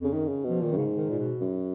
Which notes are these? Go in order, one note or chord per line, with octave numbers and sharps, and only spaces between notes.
F2 C#3
F#2 D#3
C#3
B2
F3
A#2 D#3
F#2
G#2 C#3
D#3
A#2
B2
F#2